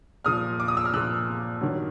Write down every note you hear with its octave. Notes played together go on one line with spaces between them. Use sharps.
A#2 F3 D#6 F6
D6
D#6
E6
F6
A#2 F3 E6 F#6
G2 D#3 F#3